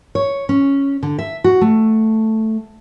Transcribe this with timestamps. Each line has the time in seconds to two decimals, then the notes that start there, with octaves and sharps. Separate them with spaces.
0.15 C#5
0.49 C#4
1.03 D3
1.19 E5
1.44 F#4
1.61 A3